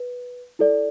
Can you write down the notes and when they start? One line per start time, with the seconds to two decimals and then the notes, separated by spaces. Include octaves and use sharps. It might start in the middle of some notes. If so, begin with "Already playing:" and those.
Already playing: B4
0.59 E4 A4 D5